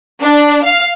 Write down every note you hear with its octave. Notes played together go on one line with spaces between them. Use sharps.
D4
F5